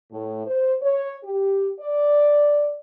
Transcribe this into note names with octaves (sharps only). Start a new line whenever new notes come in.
A2
C5
C#5
G4
D5